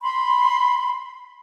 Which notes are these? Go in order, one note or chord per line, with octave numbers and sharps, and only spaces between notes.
B5 C6